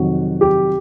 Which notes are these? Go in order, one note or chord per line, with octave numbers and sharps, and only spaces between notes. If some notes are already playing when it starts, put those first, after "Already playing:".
Already playing: F2 C3 D#3 F#3 F#4
G4